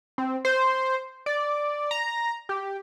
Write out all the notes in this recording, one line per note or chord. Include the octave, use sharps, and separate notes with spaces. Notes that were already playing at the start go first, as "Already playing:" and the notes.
C4
C5
D5
A#5
G4